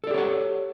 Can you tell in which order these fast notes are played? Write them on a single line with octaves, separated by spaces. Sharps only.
A4 D5 G4 C#5 F#5